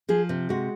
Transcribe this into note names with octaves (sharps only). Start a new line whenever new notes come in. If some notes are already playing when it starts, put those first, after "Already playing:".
F3 G#4
C3
G#3 F#4